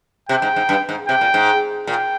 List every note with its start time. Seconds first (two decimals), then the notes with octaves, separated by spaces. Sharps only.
0.29 C3 G5
0.42 G#2
0.56 G#2
0.69 G2
0.89 G#2
1.08 C3 G5
1.21 A#2
1.34 G#2
1.87 A#2 G5